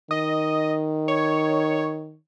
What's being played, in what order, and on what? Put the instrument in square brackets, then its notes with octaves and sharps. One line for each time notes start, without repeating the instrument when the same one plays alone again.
[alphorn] D#3 [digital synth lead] D#5
[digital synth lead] C#5